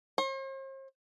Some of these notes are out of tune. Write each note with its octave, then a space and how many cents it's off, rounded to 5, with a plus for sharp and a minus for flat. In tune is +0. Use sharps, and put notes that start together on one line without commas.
C5 +45